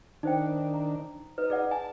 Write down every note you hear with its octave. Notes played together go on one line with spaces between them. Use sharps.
D#3 D4 D#4 C5 G5
A#5
D#4 B4
G#4 D5 F#5
G#5 A5